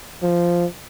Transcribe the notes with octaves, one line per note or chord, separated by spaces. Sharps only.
F3